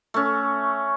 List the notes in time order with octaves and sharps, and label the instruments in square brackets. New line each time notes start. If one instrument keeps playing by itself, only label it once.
[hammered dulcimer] A3 C#4